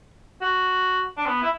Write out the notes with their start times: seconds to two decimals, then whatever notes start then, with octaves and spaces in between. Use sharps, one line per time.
0.41 F#4
1.17 D4
1.26 B3
1.42 E4